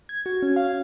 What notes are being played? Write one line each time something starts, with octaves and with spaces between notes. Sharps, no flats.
G#6
F#4
C#4
F5